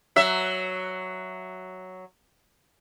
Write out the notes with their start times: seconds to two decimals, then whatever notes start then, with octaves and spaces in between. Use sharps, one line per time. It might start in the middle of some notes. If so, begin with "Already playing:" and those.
0.16 F#3 E5